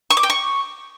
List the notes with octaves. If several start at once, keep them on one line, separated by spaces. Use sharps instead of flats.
C#6
D6
G5
C#6